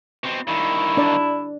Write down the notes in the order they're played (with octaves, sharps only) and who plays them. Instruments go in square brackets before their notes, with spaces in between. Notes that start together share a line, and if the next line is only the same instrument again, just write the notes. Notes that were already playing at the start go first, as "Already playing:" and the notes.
[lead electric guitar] B2 C4
[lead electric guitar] G2 D#3 [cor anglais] E4
[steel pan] D4 D5